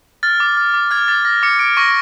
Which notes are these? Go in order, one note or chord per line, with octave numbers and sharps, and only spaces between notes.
F6 A6
D6
F6
D6
F6 G#6
D6 A6
F6 A#6
D6 C#7
F6 D7
C#6 A#6